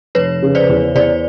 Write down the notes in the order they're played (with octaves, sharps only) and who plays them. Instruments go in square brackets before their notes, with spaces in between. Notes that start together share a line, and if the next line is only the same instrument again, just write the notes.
[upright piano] F1 [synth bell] B4 C#5
[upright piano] C#3
[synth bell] C5 D5
[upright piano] E2
[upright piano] E2 [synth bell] C5 D5